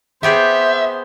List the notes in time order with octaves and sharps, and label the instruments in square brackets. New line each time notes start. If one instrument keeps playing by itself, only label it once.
[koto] B3 G4 G#4 [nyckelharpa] C5 [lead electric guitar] E5